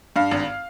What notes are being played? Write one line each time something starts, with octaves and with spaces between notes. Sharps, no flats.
G2 F5
G#1